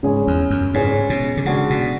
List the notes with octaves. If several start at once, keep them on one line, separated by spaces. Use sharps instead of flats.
G#2 C#3 G#3 C#4 G#4 C#5
E2
F#2
G#2 C#3 G#3 C#4 G#4 C#5
B2
D3
C#3 G#3 D4 F#4
B2